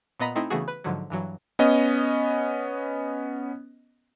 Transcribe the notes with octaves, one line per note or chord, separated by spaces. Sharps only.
A#2 B3 D#5 A#5 B5 B6
A3 C4 D#4 E4
C#3 E3 A3 B3 F#4 G#4
B4
G#2 D3 F3 F#3
G2 E3 F#3
B3 C#4 D#5